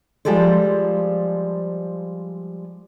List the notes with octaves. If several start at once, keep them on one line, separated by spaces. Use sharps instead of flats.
F3 G3 G#3 A4 C5